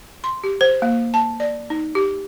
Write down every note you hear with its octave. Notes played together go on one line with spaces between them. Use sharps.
C6
G4
C5
A#3
A5
D5
D#4
G4